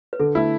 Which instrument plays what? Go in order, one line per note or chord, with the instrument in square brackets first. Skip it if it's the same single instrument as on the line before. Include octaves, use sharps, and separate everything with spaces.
[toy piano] B4
[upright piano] D3 [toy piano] A4
[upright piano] A3 E4